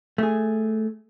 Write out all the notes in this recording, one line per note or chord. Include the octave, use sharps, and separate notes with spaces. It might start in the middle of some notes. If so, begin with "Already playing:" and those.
A3 G#4